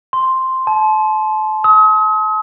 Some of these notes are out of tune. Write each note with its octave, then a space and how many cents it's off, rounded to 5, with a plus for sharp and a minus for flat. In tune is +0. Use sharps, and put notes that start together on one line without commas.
C6 +0
A5 -30
D#6 +40